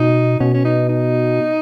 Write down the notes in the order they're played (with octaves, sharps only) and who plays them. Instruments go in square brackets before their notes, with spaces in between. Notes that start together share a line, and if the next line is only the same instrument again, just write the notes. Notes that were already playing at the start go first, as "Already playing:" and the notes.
Already playing: [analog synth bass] B2 [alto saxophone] D#4
[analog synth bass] B2 [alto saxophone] C#4
[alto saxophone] C#4
D#4
D#4